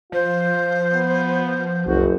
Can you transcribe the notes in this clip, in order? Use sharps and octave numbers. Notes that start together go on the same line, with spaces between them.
F3 F4 C5
B3
F#1 C2 F#4